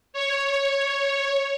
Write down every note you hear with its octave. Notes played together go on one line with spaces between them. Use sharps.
C#5